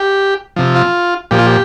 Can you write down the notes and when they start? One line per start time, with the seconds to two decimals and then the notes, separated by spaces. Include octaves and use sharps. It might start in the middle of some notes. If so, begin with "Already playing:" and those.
Already playing: G4
0.56 C3 F3
0.75 F4
1.31 A#2 F3 G4
1.38 F4
1.46 G4